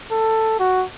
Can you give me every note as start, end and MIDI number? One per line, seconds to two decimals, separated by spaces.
0.11 0.57 69
0.59 0.85 66